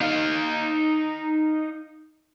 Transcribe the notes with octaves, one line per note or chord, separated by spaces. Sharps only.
D#4 F5